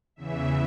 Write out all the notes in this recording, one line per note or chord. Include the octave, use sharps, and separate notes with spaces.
E2 C#3 E3 E5